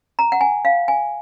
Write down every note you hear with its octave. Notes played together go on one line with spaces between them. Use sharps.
A#5
F#5
G#5
F5
G#5